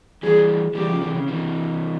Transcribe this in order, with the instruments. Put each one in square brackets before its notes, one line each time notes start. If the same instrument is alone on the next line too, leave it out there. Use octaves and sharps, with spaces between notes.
[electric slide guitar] E3 G3 [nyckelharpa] G#4
[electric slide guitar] E3 G3 [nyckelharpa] G4
[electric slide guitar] C#3 F3
C3 E3
C#3
C3 E3